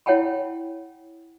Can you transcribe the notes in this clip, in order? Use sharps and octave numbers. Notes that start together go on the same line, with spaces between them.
E4 C#5 F#5 G5 A5 B5